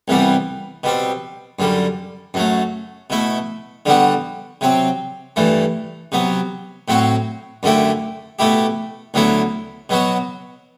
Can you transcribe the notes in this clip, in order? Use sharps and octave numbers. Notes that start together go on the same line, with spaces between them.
C2 C3 E3 G3 B3
B2 G3 C4
F#2 D3 G3
F#2 F#3 A3
B2 A3 E4
D3 G3 B3 F#4
C3 F#3 C4
G2 E3 A3
C3 F#3 B3
A2 F#3 C4 F#4
F#2 D3 A3 E4 G4
B2 A3 E4 G4
D2 D3 F#3 B3 E4
B2 F#3 B3 F#4